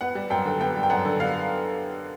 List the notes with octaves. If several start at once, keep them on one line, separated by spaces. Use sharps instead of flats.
B3 F#5
G3
F#2 G5
D3
B3 G5
G3
G5
F#2 F#5
D3
B3 F5